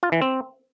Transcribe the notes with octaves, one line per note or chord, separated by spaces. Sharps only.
F4
E3
C4